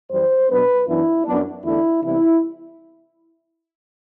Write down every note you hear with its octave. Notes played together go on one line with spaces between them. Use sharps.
F#2 E3 G3 C5
B2 F#3 B3 D4 B4
F#2 E3 B3 D4 E4
F#2 F#3 B3 D4
E2 D3 A3 D4 E4
C3 E3 G3 B3 E4